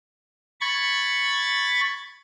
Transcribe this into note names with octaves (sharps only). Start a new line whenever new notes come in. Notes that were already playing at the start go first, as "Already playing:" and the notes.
B5 C#6 G#6 A6